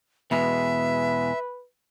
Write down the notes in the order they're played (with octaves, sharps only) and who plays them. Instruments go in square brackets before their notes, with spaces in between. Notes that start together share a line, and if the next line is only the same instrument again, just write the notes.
[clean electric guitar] E2 B2 G#3 [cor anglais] B4 [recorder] E5